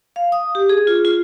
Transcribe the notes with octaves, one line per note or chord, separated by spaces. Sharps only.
F5
D#6
G4
G#4
F4
F4